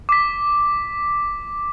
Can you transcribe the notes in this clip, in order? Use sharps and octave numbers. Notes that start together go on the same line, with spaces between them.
D6 B6